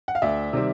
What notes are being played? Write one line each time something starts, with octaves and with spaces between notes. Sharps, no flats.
F#5
F5
D2 D5 E5
C3 D#3 G3 C4